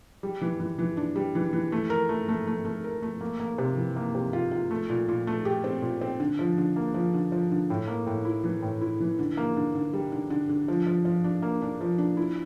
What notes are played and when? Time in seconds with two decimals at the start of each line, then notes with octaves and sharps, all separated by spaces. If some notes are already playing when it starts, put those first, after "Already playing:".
0.23 G3
0.41 E3
0.60 E3
0.78 E3
0.97 D4
1.16 G3
1.35 E3
1.53 E3
1.72 A3
1.90 A#4
2.09 A3
2.29 A3
2.47 A3
2.65 A3
2.84 A#4
3.02 A3
3.21 A#3
3.40 A#3
3.58 C3
3.77 E3
3.96 A#3
4.15 C3
4.33 F4
4.51 F4
4.71 A3
4.90 A#2
5.09 A#2
5.27 A3
5.45 G4
5.64 C4
5.82 A#2
6.01 C4
6.20 D3
6.39 F3
6.58 D3
6.76 A#3
6.94 F3
7.14 D3
7.32 F3
7.51 D3
7.70 A2
7.88 A#3
8.06 A2
8.25 E4
8.44 E3
8.62 A2
8.81 E4
9.00 E3
9.19 D3
9.37 A#3
9.57 D3
9.75 D3
9.93 G3
10.12 D3
10.30 D3
10.49 D3
10.68 F3
10.87 F3
11.05 F3
11.24 D4
11.42 A#3
11.62 D4
11.81 F3
11.98 D4
12.17 E4